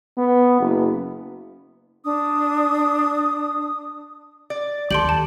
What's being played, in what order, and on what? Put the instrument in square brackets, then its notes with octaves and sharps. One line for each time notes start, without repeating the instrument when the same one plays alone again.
[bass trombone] B3
F#1
[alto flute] D4 [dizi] D#6
[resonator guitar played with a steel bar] D5
[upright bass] D#2 [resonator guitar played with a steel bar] G4 A4 [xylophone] C6 D7 F#7
[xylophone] A5